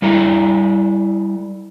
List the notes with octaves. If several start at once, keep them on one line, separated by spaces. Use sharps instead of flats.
G3 E4 A4 A#5